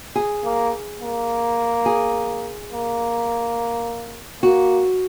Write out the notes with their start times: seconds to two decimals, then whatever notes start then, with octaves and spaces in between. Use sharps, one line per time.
0.16 G#4
0.44 A#3
1.01 A#3
1.86 G#4
2.72 A#3
4.43 A#3 F#4